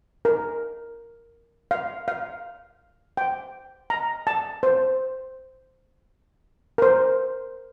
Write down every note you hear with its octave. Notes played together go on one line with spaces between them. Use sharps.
A#4
F5
F5
G5
A#5
A5
C5
A#4
C5